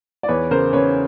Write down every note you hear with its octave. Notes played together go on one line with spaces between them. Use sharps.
D5
E2 B4 C#5
C#3 A#4 C5
C#3 B4 C#5